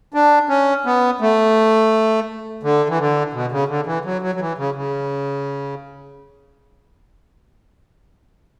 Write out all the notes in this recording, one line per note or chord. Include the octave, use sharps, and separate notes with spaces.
D4
C#4
B3
A3
D3
E3
D3
B2
C#3
D3
E3
F#3
F#3
F#3
E3
C#3
C#3